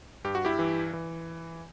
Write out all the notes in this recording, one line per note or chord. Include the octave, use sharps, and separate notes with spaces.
G2 G4
F#4
E4 G4
E3
E3